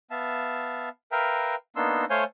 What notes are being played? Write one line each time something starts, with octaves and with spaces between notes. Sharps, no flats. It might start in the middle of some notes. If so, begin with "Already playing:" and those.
B3 E5 F5 A5
A#4 B4 E5 F5 G5 A#5
A#3 B3 D4 D#4 C6 E6
A3 C5 C#5 F5 G#5 G6